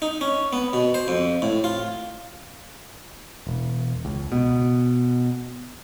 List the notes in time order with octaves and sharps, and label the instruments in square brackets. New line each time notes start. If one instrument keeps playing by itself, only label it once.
[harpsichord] D#4
C#4
B3
B2
C5
F2
A2
F4
[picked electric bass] E1
C#2
B2